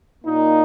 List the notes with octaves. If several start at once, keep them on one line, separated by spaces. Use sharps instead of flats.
A#2 A#3 D#4